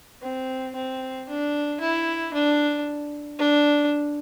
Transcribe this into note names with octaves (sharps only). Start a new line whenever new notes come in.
C4
C4
D4
E4
D4
D4